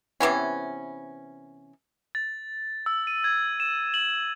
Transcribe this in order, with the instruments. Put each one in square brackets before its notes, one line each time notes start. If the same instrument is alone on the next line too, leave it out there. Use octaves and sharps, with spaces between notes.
[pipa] C3 E3 B3 C#4
[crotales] A6
E6
D#7
G#6
E7
F#7